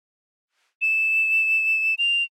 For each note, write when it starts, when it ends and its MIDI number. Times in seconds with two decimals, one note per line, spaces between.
0.82 1.95 100
1.98 2.23 101